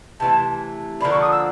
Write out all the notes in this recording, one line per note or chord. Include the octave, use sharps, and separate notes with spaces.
C3 E3 A3 A5
D3 F3 A#3 D4 B5
C#6
D#6
E6